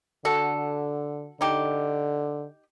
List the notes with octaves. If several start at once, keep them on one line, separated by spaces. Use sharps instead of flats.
D3 F#4 A4
D3 D#4 G4